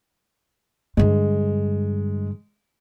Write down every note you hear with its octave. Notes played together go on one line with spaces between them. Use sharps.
G2 D3 G#3